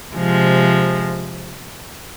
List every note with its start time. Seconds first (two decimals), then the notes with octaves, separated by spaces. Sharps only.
0.14 C3 F3 G#3